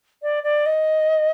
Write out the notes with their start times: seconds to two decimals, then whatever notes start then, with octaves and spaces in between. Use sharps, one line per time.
0.22 D5
0.43 D5
0.66 D#5